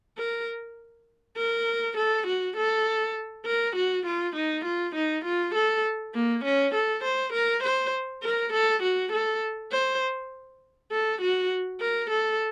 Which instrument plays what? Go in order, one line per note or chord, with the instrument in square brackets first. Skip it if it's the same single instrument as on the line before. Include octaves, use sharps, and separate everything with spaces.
[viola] A#4
A#4
A4
F#4
A4
A#4
F#4
F4
D#4
F4
D#4
F4
A4
A#3
C#4
A4
C5
A#4
C5
A#4
A4
F#4
A4
C5
A4
F#4
A#4
A4